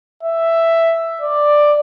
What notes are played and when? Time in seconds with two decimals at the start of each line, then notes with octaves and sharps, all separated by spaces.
0.23 E5
1.21 D5